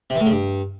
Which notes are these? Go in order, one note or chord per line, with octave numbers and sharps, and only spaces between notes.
C3
E3
A2
C#3
G2